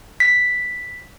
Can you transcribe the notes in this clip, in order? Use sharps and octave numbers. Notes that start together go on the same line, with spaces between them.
B6